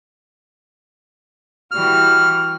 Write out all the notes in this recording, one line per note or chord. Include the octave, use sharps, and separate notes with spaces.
E3 G3 F#4 F6